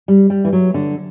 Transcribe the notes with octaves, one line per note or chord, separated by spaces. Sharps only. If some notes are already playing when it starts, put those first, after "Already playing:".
G3
G3
E3
F#3
D3